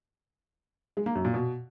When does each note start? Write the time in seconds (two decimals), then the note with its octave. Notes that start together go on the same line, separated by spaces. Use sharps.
0.97 G#3
1.06 A#3
1.15 F#2
1.25 A#2
1.34 B2